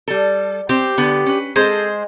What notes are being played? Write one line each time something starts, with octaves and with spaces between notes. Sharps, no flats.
G3 A4
C4 G4 C5
D3 B3 B4
C#4 B4
G#3 C4 A4 C5